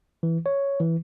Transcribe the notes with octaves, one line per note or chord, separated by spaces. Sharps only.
E3
C#5
E3